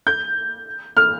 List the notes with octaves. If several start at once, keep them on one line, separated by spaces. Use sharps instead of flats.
G6
F6